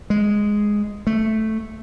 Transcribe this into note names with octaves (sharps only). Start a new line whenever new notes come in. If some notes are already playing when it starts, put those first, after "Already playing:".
G#3
A3